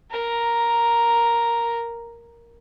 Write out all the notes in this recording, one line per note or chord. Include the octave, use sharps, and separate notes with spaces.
A#4 A#5